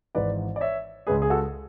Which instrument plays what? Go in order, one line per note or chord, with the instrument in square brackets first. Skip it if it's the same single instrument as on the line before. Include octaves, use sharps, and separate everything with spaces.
[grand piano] G#1 G#2 E3 B4 D5
D5
C#5 E5
C#2 C#3 G#3 G#4 B4
G#4
F#4 A4